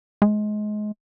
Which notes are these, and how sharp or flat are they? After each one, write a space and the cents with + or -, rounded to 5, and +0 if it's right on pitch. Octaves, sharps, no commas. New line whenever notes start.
G#3 +25